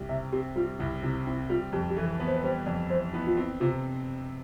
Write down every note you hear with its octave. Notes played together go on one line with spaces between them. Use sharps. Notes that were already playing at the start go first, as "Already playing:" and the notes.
Already playing: C2 G3
C3 E5
C4 G4
G3 F4
C2 E4
C3 E4
C4 E4
G3 F4
F2 G4
G4
E3 A4
B3 B4
C5
B4
G3 C5
F2 D5
E3 C5
B3 E4
F4
C4 E4
C3 F4